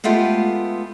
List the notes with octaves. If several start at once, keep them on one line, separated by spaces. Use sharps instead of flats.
G#3 A3 B3 F4 G4